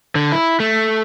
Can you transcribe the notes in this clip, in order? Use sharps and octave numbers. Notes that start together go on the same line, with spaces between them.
D3
E4
A3